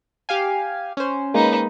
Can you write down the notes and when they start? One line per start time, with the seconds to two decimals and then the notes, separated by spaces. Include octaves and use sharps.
0.29 G4 F5 G#5
0.97 C#4 C5
1.34 G#3 A#3 D#4 B4